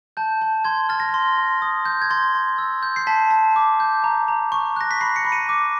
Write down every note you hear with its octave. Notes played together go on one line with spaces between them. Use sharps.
A5 G6
A5
C6 G#6
F6 A6
A#6
A6
C6
C6
D#6
G6
G#6
C6 A6
C6
E6
G6
C7
A5 B6
A5
D6
G6
A#5
A#5
C#6
F#6 A#6
B6
B5 C7
C#7
B5
D#7
D6